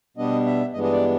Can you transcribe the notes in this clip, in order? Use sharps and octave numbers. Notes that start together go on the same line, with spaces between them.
B2 G3 B3 D4 D#5
E5
G2 E3 G#3 B3 D4 D#5
D#5
D5